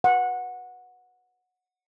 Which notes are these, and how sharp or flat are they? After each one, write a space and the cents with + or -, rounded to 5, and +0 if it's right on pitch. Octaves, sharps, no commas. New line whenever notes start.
F#5 -15